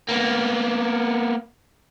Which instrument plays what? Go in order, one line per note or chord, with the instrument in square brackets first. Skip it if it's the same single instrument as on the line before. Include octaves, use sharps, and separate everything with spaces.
[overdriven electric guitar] A#3 B3